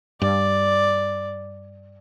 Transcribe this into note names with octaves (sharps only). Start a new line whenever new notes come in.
G2 D5